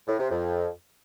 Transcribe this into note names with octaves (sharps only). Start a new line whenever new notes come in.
A2
C3
F2